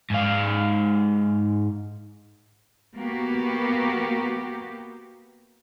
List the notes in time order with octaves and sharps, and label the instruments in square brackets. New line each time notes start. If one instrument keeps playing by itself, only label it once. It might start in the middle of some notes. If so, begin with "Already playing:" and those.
[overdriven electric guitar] G#2 F5
[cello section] A#3 B3 F#4 G4